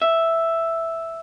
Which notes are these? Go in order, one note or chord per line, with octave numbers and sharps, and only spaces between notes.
E5